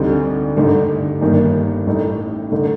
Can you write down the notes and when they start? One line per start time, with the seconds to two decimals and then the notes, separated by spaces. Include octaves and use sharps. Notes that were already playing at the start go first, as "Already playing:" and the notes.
Already playing: D2 D3 G3 C4 D#4
0.56 G2 D3 A3 D#4
1.21 G1 G2 D#3 A#3 D#4
1.87 A1 A2 A3 D#4
2.52 D3 A3 D#4